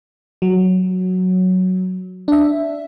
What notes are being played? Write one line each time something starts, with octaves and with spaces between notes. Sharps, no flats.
F#3
D4 E5